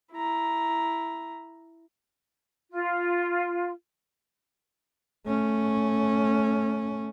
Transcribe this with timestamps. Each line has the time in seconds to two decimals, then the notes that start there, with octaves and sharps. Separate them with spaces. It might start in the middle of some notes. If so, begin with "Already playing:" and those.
0.12 E4 A#5
2.71 F4
5.26 A3 C#4